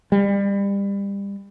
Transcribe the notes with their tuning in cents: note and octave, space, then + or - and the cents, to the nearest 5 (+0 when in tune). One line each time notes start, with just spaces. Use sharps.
G3 +30